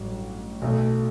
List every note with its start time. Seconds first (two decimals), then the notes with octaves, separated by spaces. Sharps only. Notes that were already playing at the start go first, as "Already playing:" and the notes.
Already playing: A1 G2 F#3
0.62 B1 B2 F#3 A3